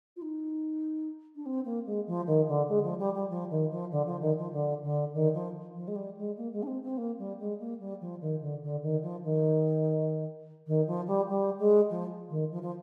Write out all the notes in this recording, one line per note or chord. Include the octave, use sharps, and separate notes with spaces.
F4
D#4
D4
C4
A#3
G#3
F3
D#3
D3
G#3
F3
G3
G3
F3
D#3
F3
D3
F3
D#3
F3
D3
D3
D#3
F3
F3
G#3
G3
G#3
A#3
G#3
D4
C4
C4
A#3
G3
G#3
A#3
G3
F3
D#3
D3
D3
D#3
F3
D#3
D#3
F3
G3
G3
G#3
F3
D#3
F3
F3